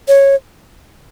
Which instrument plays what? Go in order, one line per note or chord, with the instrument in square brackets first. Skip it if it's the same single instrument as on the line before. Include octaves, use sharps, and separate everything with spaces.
[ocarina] C#5